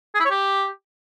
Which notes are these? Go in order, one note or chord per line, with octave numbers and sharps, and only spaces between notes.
G#4
E4
C#5
G4